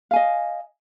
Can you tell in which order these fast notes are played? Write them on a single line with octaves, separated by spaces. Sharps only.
F5 G#5 D#5